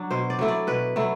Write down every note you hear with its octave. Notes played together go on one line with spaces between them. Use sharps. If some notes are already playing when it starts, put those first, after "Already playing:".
Already playing: F#3 D4
B2 C5
D5
F#3 A3 E4
D5
B2 B4
F#3 A3 E4